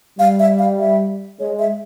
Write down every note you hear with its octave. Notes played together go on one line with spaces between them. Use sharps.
G3 F5
E5
F5
E5
G#3 C#5
E5